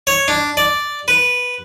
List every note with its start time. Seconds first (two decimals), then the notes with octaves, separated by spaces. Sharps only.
0.07 C#5
0.28 D4
0.57 D5
1.08 B4